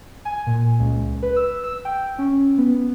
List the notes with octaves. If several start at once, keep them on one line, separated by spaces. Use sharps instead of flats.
G#5
A#2
C#2
B4
E6
E6
G5
C#4
B3